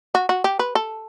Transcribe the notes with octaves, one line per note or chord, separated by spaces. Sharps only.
F#4
F#4
G4
B4
A4